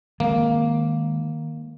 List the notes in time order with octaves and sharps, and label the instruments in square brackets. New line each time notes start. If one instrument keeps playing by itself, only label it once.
[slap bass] D#3 G#3 C4 [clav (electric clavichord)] A#3